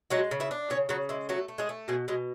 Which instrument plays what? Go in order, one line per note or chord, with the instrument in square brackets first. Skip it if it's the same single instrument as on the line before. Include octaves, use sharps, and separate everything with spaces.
[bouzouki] F#3 G#3 F#4
C#3
E4 E5
D4
C#3 C#4 C#5
C#3 F#3 F#4
G#3 E4
F#3 A3 F#4
A3
G#3 G#4
A3
B2 G#3 G#4
B2 G#3 G#4